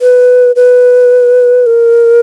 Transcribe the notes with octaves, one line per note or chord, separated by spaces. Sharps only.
B4
B4
A#4